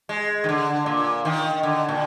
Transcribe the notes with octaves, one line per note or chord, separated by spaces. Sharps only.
G#3
D#3
D3
A#2
D#3
D3
A#2